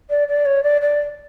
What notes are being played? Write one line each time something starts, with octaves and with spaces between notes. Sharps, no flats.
D5
D5
C#5
D5
D5